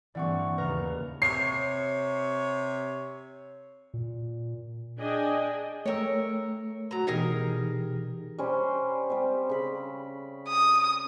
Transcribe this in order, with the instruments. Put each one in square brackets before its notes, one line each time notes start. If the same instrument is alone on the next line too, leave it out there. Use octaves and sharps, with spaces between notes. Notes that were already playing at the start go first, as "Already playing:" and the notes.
[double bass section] G2 A#3 C4 [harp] E3 [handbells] D5 F#5 C#6
[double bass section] D#2 A2 C#3 [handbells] B4 [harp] A#5 F6
[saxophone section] C3 C#5 [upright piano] C7
[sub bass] A#2
[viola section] D4 G#4 D5 D#5 G5 G#5
[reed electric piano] A3 G5 E6 [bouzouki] A#4 C#5
[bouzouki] F#3 A#5
[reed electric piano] B2 E3 D#4 [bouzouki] G3 G#4 A#4
[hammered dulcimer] G3 C#4 C5
G3 C4
C#3 B5
[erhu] D#6